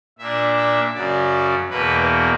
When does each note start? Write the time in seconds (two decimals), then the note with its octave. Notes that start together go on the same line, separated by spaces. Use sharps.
0.19 A#2 A#3 D4 E5
0.57 E5
0.94 F#2 C#3 F#3 D5
1.70 E2 B2 A#3 B4